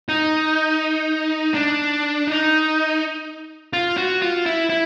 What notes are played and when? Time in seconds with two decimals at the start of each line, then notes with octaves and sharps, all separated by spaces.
0.09 D#4
1.54 D4
2.27 D#4
3.73 F4
3.97 F#4
4.22 F4
4.46 E4
4.70 E4